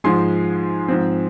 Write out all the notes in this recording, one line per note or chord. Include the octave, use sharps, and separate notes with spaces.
G#2 F3 G#3 G#5 C6
G#2 F3 C4